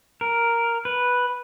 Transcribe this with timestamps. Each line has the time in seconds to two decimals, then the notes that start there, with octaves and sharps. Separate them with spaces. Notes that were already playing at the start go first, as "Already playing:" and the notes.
0.21 A#4
0.85 B4